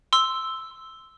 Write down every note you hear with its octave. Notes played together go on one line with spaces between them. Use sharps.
C6 E6